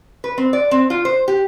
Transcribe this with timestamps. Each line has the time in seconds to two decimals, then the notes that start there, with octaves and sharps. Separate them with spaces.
0.24 B4
0.38 C4
0.53 D5
0.71 C4
0.90 F4
1.05 C5
1.28 G4